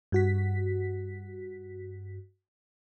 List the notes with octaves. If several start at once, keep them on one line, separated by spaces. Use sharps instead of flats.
G2 F#4 B6